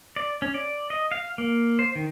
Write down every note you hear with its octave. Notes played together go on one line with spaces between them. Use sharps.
D5
C#4
D5
D#5
F5
A#3
C5
D#3